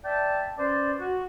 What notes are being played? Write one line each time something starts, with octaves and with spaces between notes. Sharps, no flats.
D5 E5 G5 A5
C#4 B4 C5 D5
F#4